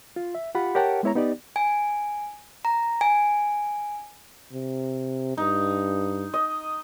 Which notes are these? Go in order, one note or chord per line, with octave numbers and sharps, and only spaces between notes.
F4
E5
F4 G4 F#5 B5
G4 A#4 C#5 F#5 G5 A5
G#3 B3 E4 C#5 A#5
B3 D#4 G4 D5
G#5
A#5
G#5
C3
G2 D#4
D#5